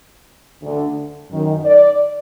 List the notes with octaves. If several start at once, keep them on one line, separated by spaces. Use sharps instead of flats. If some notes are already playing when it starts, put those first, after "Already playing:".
D2 D3
F#2 D#3
D5